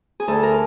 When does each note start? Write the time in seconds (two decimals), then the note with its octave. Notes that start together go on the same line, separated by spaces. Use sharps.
0.20 G#4
0.28 D2 A4
0.43 A#4